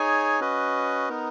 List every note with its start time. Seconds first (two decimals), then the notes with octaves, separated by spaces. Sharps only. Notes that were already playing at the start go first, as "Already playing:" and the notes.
Already playing: D#4 G#4 C#5 G#5
0.40 C#4 F#4 B4 D#5
1.09 B3 D#4 A#4